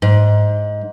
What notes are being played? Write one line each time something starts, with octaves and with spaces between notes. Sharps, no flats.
G#2